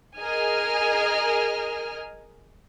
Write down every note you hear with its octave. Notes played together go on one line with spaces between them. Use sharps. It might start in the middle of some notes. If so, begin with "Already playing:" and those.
G#4 A#4 D#5 G#5 F6